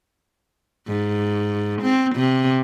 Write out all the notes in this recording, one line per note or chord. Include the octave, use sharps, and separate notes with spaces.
G#2
C4
C3